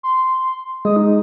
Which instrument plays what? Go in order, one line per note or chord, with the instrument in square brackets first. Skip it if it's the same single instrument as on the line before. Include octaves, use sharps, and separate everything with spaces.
[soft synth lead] C6
[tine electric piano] G#3 [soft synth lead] D#6
[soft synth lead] D#4